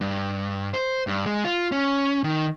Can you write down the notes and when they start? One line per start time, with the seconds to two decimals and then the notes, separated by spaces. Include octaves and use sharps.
0.01 G2
0.74 C5
1.07 G2
1.26 G#3
1.44 F4
1.72 C#4
2.24 D#3